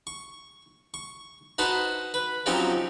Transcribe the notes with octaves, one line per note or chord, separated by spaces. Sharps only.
C#6
C#6
D#4 F#4 B4 C5 A5
B4
F3 F#3 C4 C#4 D#4 G4